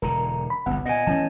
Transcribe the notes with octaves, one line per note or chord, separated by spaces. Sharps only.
E1 D3 A#4 A#5
B5
G1 C2 B3 F#5
A#2 D#5 G#5
E3 A3 B3 C#4 A5